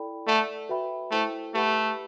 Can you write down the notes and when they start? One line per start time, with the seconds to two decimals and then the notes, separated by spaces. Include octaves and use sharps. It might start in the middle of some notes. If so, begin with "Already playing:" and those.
Already playing: E4 A4 D5 G5 B5
0.27 A3 A4 D5 F#5
0.69 F#4 B4 E5 G5 B5
1.11 A3 E4 A4 C5 G5
1.54 A3 G4 B4 F#5 B5